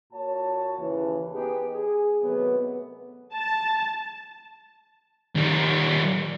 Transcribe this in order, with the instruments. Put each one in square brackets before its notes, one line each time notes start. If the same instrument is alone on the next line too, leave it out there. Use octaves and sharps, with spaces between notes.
[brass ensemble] A#2 F#4 C#5 A5
D#2 C#3 E3
B3 D#4 G4 G#4 B4
G#4
C3 D#3 F#3 A3 B3
[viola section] A5
[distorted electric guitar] D#3 G3